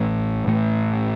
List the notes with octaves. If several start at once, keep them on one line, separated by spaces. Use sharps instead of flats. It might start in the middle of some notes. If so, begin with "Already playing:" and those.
Already playing: A1 A2 E3 A3
A2 E3 A3